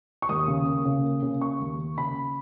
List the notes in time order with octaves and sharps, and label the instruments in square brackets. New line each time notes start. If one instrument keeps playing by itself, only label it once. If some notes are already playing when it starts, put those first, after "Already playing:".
[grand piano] C#6
D#2 D#6
C#3
A#3
C#3
A#3
C#3
A#3 C#6
D#2
A#3
C#3 B5